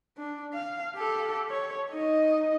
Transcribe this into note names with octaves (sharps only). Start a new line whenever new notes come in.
D4
F5
G4 A4
C#5
D#4 D#5